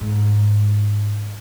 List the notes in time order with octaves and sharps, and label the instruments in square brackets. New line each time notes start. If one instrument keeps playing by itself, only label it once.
[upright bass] G#2